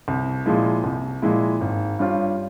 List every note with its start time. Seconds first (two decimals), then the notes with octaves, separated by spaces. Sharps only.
0.08 C2
0.45 A#2 F3 G#3 E4
0.84 C2
1.22 A#2 F3 G#3 E4
1.61 G#1
1.99 G2 G3 C#4 F4